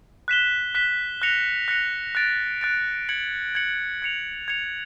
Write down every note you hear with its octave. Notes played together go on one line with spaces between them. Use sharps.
F#6 B6 E7 G7
F#6 B6 E7 G7
F#6 A#6 C#7 F7
F#6 A#6 C#7 F7
F#6 A6 D7
F#6 A6 D7
G#6 C#7 F#7
G#6 C#7 F#7
G#6 C#7 F7
G#6 C#7 F7